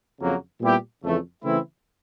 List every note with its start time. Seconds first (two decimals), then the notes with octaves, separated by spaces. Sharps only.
0.20 F2 C#3 F#3 A#3
0.61 A#2 G3 B3 E4 G4
1.03 F2 C#3 E3 A3
1.44 C#3 E3 A3 C4 E4